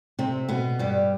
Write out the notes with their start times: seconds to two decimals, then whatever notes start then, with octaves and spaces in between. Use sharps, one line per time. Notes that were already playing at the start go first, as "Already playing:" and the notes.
0.19 C3 C4
0.48 B2 B3
0.79 G2 G3